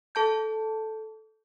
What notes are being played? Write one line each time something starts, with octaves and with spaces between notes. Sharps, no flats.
A4 A5 G6